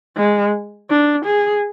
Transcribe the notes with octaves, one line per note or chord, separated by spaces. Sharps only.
G#3
D4
G#4